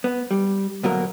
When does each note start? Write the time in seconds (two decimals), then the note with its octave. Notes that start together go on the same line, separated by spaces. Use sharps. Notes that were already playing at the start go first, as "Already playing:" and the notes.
0.04 B3
0.31 G3
0.83 D2 B2 F#3 A#3 A#4